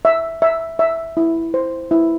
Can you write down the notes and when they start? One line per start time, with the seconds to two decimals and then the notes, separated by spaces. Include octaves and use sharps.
0.05 E5
0.42 E5
0.79 E5
1.17 E4
1.54 C5
1.91 E4